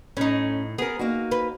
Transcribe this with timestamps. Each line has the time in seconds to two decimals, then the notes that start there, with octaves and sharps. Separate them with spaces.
0.17 A2 C#4 D#4
0.78 B3 G#4 A#4
0.99 A#3 D#4 F#4
1.31 B4